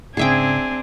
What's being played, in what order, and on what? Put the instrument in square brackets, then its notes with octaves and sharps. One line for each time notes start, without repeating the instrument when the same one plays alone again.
[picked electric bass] G#2 C#3 [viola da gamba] C4 D4 [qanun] G#4 E5 G5 [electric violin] G#5